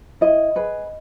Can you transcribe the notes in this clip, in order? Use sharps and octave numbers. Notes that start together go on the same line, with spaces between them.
E4 D#5
G#4 B4